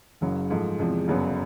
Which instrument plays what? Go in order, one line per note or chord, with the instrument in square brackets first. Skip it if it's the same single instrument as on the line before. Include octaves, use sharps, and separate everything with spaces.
[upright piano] F#1 F#2 C#3 F#3
G#2 F3 A3
E2 C3 F3 G#3
G1 F#2 C#3 F#3 B3